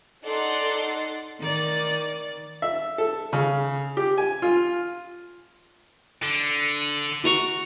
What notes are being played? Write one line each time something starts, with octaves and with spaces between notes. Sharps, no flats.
D#4 A4 D5 F#5 C6 A6
D#3 D5
E5
A4
C#3
G4
G#5
F4
D3
F#4 A#5 C#6